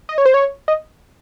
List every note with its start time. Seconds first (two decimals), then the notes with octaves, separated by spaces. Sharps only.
0.09 D#5
0.18 C#5
0.26 C5
0.34 C#5
0.68 D#5